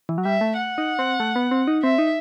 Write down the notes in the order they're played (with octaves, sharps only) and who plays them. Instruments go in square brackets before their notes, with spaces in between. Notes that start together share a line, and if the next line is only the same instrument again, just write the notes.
[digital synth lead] E3
F#3
[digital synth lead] G3 [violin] E5
[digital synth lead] A3
[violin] F#5
[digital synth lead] D#4
C4
A3
B3
C4
D#4
[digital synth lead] C4 [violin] E5
[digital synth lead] D#4